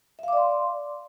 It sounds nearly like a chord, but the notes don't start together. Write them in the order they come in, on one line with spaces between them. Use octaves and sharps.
E5 F5 D6 D5 C6